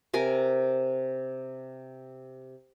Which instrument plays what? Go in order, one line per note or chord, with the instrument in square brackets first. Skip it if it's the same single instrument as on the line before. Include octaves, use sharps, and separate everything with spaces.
[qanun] C3 A#4 G#5